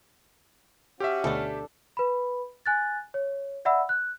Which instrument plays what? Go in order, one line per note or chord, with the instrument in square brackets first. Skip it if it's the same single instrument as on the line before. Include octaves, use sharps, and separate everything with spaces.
[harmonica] C#4 F#4 [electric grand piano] G4 E5
[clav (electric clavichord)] D2 B2 A3 [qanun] D4 A4
[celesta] B4 B5
G#5 F#6 A6
C#5
D5 E5 F#5 B5 E6
F#6